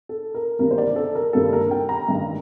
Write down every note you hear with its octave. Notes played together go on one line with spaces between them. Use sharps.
A4
A#4
G1 G2 D#3 G3 A#3 A#4
C5
D5
A4
A#4
G1 G2 D#3 G3 A#3 A4
A#4
G5
A#5
A1 G2 D#3